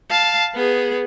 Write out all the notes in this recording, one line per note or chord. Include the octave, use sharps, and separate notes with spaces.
F5 A5
B3 G#4